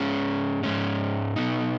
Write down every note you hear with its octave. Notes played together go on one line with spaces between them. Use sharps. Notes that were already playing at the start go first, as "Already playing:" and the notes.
Already playing: G#2 G#3 C#4
G#2 G#3 C#4
B2 B3 D#4